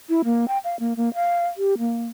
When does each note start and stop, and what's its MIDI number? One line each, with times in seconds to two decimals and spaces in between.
0.09 0.22 64
0.25 0.48 58
0.48 0.58 79
0.64 0.76 77
0.80 0.93 58
0.97 1.13 58
1.14 1.47 77
1.57 1.78 67
1.78 2.07 58